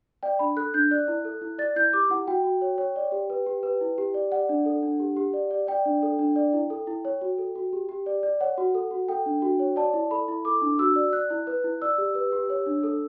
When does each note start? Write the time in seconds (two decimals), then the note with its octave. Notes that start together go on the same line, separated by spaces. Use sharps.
0.23 D5 G5
0.39 D4 B5
0.56 A4 F#6
0.74 D4 G6
0.91 D5 F#6
1.08 E4
1.25 A4
1.42 E4
1.59 D5 A6
1.76 E4 G6
1.93 G4 D6
2.10 E4 F#5
2.27 F#4 G5
2.44 F#4
2.62 C#5
2.78 C#5
2.96 D5
3.12 G4
3.30 B4
3.46 G4
3.63 B4
3.81 E4
3.98 G4
4.14 D5
4.32 D5 F#5
4.49 D4
4.66 A4
4.83 D4
5.00 G4
5.17 G4
5.33 D5
5.51 D5
5.67 D5 G5
5.86 D4
6.03 A4
6.19 D4
6.36 D5
6.53 E4
6.70 A4
6.87 E4
7.05 C#5
7.21 F#4
7.38 A4
7.55 F#4
7.73 G4
7.89 G4
8.06 D5
8.23 D5
8.41 C#5 F#5
8.58 F#4
8.74 A4
8.91 F#4
9.08 A4 G5
9.26 D4
9.42 F#4
9.59 C#5
9.76 D5 A5
9.94 E4
10.11 A4 B5
10.28 E4
10.45 A4 D6
10.62 D4
10.79 F#4 E6
10.96 D5
11.13 D5 F#6
11.30 E4
11.47 B4
11.64 E4
11.82 D5 E6
11.98 G4
12.15 B4
12.32 G4
12.50 C#5
12.66 D4
12.83 A4